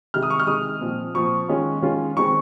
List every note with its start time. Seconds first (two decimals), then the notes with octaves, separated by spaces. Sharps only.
0.14 C3 D#3 G#3 F6
0.23 D#6
0.30 C#6
0.39 F6
0.47 C3 D#3 G#3 D#6
0.81 A#2 F3 C4
1.14 A#2 F3 C4 C#6
1.48 D#3 G#3 C#4 F4
1.82 D#3 G#3 C#4 F4
2.17 D#3 G#3 C4 C#6